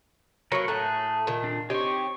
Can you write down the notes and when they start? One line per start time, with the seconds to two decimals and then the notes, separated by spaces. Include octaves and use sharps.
0.52 F#3 A#3 A#4 B4 C#5
0.68 A2 A3 G#4 A#5 F#6
1.27 A#2 D#3
1.44 D4
1.70 C4 D#4 G4 C#5 C#6